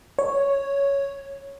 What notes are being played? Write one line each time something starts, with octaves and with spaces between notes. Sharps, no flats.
C#5